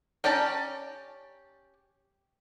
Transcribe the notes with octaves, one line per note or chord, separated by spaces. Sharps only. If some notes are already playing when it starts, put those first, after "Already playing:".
C#4 G4 D5 A5 A#5